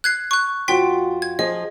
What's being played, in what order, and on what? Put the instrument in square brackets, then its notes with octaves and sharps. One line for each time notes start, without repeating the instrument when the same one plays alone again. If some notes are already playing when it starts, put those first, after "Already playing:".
[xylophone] F#6 G#6 C7
C#6 F#6
[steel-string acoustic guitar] F2 F4 F#4 [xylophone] G5 C6 B6
[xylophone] G#6
[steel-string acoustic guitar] F3 G#4 [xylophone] D#5